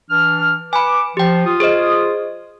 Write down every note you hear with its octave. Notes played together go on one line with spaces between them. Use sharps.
E3 D4 F6
B4 G#5 B5 D6
F3 G4 G5
F4 D#6
G#4 C5 D#5